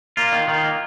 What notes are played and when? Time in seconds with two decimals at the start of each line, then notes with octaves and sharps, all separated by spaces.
0.17 A#3 F4
0.32 D#3
0.48 D#3
0.64 A#3